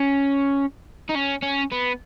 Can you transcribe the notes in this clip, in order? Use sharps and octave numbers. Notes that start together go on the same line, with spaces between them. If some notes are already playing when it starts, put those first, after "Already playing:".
Already playing: C#4
D#4
C#4
C#4
B3